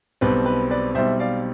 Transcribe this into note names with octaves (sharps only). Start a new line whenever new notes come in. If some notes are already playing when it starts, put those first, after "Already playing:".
B1 B2 G3 C4 B4
B4
B4 D5
B1 B2 G3 C4 C5 E5
D5 F5